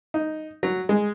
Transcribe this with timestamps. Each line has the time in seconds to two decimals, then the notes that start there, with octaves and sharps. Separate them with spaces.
0.14 D#4
0.63 F#3
0.89 G#3